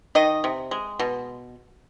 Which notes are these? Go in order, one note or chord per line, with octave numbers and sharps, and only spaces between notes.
D#3 D#5
C3
G#3
B2